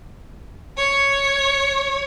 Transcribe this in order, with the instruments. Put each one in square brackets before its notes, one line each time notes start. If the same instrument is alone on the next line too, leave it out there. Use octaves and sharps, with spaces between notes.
[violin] C#5